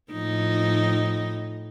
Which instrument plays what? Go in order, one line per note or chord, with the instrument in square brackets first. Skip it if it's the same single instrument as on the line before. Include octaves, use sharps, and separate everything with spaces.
[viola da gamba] A2 F3 D#4